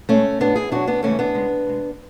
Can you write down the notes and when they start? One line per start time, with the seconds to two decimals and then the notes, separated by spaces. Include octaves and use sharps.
0.09 B2 G#3 A3 C#4
0.40 A2 F#3 B3 D4
0.56 E4 G#4
0.72 B2 F#3 D4 F#4
0.87 B3 D4
1.03 C#3 E3 G#3 A3 C#4
1.19 B3 D4
1.34 C#3 G#3
1.66 B2 G#3